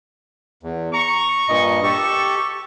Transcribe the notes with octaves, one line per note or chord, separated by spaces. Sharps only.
E2
A#5 C#6
G2 A#2 D#5
G4 A4 C#6